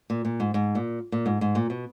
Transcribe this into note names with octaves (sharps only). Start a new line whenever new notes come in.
A#2
A#2
G#2
G#2
A#2
A#2
G#2
G#2
A#2
B2